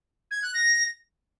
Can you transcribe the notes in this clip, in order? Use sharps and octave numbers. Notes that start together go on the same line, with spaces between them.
G#6
F#6
A#6